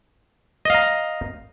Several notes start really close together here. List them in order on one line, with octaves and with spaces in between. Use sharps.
D#5 F5 A#5